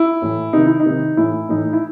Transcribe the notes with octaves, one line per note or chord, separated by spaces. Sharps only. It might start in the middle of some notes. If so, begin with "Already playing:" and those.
Already playing: E4
A2 E3
C3 D#3 D#4
E4
D#4
C3 D#3
A2 E3 E4
A2 E3 D#4
E4